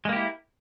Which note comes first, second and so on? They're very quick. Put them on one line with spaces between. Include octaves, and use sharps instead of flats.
G#3 A#3 G4 E4